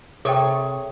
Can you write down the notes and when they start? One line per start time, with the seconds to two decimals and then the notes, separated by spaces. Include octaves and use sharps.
0.25 C3 G#4 A4 C#5 G5